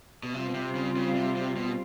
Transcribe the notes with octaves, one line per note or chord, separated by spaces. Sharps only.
B2
C3 G3 C4 F4
B2
C3
C#3
C#3
C3
C3
B2